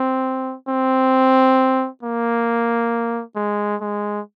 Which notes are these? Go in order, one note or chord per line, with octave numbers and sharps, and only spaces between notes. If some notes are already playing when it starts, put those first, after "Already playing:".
Already playing: C4
C4
A#3
G#3
G#3